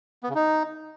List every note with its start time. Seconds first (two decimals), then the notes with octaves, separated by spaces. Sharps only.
0.24 B3
0.29 C#3
0.35 D#4